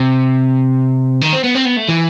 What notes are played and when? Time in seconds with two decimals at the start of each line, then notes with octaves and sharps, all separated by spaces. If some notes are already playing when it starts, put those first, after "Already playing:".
Already playing: C3
1.22 D#3
1.33 C4
1.44 B3
1.55 C4
1.66 B3
1.77 A3
1.89 E3